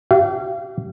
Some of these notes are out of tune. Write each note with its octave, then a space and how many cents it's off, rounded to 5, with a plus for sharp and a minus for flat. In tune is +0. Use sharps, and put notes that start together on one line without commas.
G4 -40 F5 -40